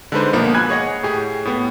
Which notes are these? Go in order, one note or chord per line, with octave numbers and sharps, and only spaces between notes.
D3 G#3 D4 D#4 B4 C5
B1 F3 A#3 B3
G#5 B5 F#6 G#6
G#4 C#5 D#5 F#5
A2 G4 G#4
A2 B3